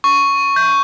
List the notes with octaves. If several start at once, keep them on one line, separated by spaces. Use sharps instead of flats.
C#6
G6